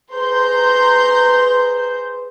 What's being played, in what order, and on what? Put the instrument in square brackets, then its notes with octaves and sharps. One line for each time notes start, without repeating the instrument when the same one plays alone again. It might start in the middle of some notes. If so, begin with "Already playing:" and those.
[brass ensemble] G#4 B4 C5 [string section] A#5 C6 G6